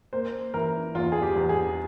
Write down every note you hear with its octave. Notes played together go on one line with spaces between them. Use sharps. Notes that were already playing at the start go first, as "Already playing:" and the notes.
A#3 C5
E3 A#4
E2 F4
G#4
G4
E2
G#4